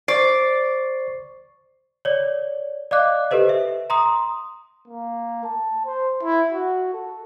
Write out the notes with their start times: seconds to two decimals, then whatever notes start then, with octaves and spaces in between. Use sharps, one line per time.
0.08 C5 D5 C#6 C7
2.05 C#5 D5
2.91 D5 D#5 F5 D6 F#6
3.31 G4 A4 B4 C5 D#5
3.49 E5
3.90 A#5 C6 D#6
4.88 A#3
5.44 A5
5.86 C5
6.23 E4
6.52 F#4
6.93 A4